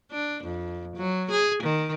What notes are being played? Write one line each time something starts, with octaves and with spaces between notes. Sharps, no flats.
D4
F2
F#3
G#4
D#3